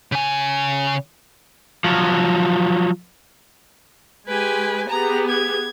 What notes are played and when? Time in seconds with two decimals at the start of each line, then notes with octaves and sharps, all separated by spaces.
0.12 C#3 G#5
1.84 F3 F#3
4.28 G#3 G4 B4 G#5
4.89 B3 G4 G#4 A#5
5.29 G#6